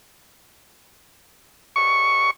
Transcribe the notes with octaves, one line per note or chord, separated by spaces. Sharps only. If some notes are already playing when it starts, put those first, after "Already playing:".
C#6